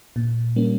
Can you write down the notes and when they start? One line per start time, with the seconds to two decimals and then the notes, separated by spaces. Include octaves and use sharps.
0.16 A#2
0.56 G3 A#3 C#4